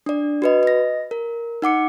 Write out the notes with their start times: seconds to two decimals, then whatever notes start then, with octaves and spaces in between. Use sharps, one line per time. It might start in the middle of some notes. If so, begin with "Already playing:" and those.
0.06 D4 D5
0.42 F#4 B4 D#5
0.63 D#5 A#6
1.11 A#4
1.62 D#4 F#5 D6 C#7